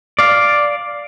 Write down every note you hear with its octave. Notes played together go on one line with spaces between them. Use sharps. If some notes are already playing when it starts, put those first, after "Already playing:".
D5 F5